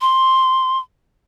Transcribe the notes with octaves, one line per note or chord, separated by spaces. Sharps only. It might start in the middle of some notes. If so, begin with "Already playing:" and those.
C6